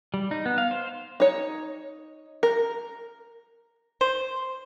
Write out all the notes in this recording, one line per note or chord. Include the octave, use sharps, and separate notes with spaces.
G3
D#4
B3
F5
C5
D#4 C#5
A#4
C5